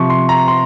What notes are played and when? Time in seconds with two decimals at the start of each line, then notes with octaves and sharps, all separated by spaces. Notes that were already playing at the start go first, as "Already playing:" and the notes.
Already playing: C3 F3 C#6
0.10 C6
0.29 A#5
0.48 C6